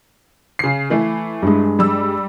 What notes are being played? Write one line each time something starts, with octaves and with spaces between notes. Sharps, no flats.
C#3 C7
E3 A3 E4
G2 G#3
G3 E6